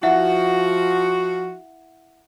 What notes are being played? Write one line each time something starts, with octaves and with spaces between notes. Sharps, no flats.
F3 E4 F#4 E5 F#5